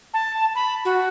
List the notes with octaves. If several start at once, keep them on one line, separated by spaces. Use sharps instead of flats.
A5
B5
F#4